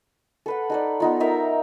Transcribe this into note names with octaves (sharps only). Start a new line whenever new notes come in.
A4 B4 F#5
D#4 A4 D5
B3 D#4 F4
D#4 A#4 E5 A#5